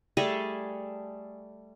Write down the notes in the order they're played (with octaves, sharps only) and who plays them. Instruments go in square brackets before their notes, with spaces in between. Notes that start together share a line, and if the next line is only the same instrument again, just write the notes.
[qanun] G3 A3 G#4 A4